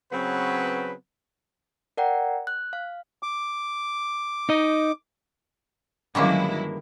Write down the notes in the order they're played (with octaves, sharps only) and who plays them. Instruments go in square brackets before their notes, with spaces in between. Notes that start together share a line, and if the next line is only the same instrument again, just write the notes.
[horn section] C#3 F#3 B3 C4 B4
[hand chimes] A#4 D5 F#5 G5 A#5
F#6
F5
[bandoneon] D6
[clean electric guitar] D#4 D#5
[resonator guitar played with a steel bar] G2 A#3 [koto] D3 D#3 C#4 [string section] F#3 G#3 E4